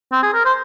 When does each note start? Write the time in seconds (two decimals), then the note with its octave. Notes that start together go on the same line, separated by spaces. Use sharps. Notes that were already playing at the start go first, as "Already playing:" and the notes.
0.12 C4
0.22 G#4
0.33 A#4
0.45 C5